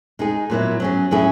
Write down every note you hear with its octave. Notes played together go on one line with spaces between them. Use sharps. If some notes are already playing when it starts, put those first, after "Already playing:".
G#3 D#4 G#4
A#2 F#3 B3 E4
F#3 C#4 G#4
F#3 C#4 E4 G#4